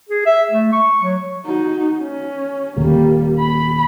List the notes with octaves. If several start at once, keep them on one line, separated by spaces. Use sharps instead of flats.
G#4
E5
A3
C#6
F#3
D#4 F#4
C#4
D#1 G3 A#3
B5